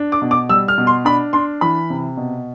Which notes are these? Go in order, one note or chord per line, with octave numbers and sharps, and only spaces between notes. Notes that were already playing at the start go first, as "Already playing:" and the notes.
Already playing: D4
D6
B2
D6
G3 E6
F6
B2
C6
D4 B5
D4 C6
E3 B5
C3
B2